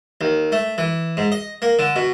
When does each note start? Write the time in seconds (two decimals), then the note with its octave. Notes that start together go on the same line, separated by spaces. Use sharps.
0.21 D#2
0.52 A3
0.78 E3
1.17 G#2
1.32 D#5
1.62 A#3
1.79 D3
1.96 B2